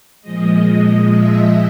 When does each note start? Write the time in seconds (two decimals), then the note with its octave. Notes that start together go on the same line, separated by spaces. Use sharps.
0.22 A#2 F3 G#3 D#5
1.14 E5